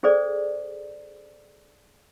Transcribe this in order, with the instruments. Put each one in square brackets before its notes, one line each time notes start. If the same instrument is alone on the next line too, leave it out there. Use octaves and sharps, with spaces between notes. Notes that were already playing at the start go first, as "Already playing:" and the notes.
[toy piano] C#4 G#4 A4 C5 D5